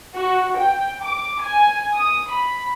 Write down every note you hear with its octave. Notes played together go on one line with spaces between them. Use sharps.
F#4
G5
D6
G#5
D#6
B5